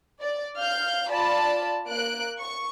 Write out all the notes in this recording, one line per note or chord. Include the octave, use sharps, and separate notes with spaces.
D5
F5 F6 G6
F4 D5 A5 B5
A#3 F#6 D7
C#6